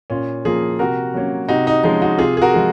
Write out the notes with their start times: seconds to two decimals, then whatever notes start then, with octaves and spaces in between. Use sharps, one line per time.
0.10 A#2 C#4 F4
0.45 F3 A#3 C#4 F4 G#4
0.79 C3 F#4 A#4
1.14 F#3 A#3 C#4
1.49 C3 D#4 F#4
1.67 D#4
1.84 F3 G#3 C#4 D#4
2.02 D#4 F#4
2.18 C3 F4 G#4
2.37 G#4
2.42 F#4 A#4
2.54 F3 G#3